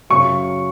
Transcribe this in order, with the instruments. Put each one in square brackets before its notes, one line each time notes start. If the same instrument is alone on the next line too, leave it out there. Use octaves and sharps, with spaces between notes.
[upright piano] F#2 C#3 F#3 C#6